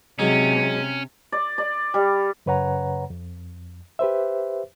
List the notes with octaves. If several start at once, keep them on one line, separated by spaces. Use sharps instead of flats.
C3 F#3 G#3 C#4 D#4
D5
D5
G3
F#2 C#3 B4 C#5 F#5 A#5
F2
G4 B4 C5 E5